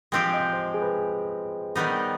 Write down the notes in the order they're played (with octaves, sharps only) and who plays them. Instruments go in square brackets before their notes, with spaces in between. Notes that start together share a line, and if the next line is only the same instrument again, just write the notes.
[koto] F3 G#3 C4 G4 [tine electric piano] G5
[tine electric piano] D#5
C5
G#4
B4
G#4
[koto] D#3 G3 B3 D#4